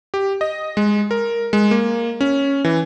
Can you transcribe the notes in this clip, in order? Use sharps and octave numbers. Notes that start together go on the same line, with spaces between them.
G4
D#5
G#3
A#4
G#3
A#3
C#4
E3